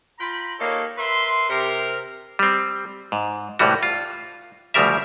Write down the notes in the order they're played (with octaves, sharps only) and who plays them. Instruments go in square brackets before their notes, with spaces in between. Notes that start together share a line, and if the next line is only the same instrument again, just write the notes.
[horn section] F4 G5 A#5 B5
A#3 D#4 G4 A4 C#5
A#4 B4 E5 C6
C3 G4 A#4
[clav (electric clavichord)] G3 C4
G#2
C2 A2 E3 G3 F#4
F4
D2 C#3 F3 G3 A#4 E5